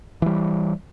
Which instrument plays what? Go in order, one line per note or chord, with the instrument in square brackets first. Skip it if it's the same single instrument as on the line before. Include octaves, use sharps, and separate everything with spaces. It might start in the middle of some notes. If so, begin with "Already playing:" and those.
[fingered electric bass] E3 G3